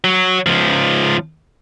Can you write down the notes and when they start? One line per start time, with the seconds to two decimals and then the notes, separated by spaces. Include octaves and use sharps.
0.04 F#3
0.47 C#2 F3